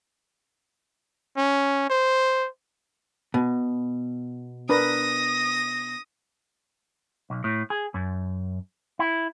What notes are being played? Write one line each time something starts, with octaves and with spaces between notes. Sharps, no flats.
C#4
C5
B2
D4 A#4 B4 D#6 A#6
B1
A2
G#4
F#2
E4